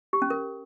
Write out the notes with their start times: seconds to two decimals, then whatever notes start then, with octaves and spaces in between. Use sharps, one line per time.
0.13 G4
0.22 C#4
0.30 A#4